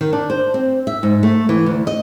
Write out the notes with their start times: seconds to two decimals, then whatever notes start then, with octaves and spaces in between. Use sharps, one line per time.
0.01 D#3
0.13 D4
0.30 C5
0.54 C4
0.87 E5
1.03 G#2
1.23 A3
1.49 E3
1.66 D2
1.87 D#5